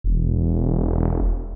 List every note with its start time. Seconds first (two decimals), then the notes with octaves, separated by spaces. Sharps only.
0.04 E1